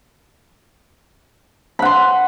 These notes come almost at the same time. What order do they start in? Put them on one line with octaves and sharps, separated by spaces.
B5 F#5 C6